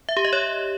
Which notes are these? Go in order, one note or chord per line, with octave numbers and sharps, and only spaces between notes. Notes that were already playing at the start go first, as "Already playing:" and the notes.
E5
G4
D#5
C#5